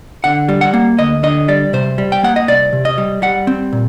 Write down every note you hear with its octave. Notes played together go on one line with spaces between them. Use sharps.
D3 F#5
G3
F#5
A#3
D2 D#5
D3 D#5
G3 D5
C3 C5
G3
G5
A#3 F#5
D#5
C2 D5
C3
D#5
G3
G3 F#5
C4
A#2